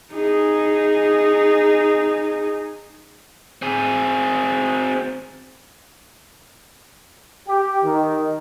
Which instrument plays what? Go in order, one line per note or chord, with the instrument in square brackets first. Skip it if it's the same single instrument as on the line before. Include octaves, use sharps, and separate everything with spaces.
[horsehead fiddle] D#4 G#4
[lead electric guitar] C4 G#4
[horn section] G4
D#3